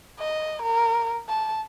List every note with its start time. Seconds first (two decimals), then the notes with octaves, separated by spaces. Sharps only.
0.19 D#5
0.63 A#4
1.28 A5